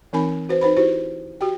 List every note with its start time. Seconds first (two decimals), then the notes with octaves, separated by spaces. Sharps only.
0.13 E3 C4 D#4 A#4 G#5 B5
0.49 F#4 B4 C5
0.61 D#4 B4 C5 B5
0.77 E4 F#4 G4 C5
1.41 F#4 G4 G5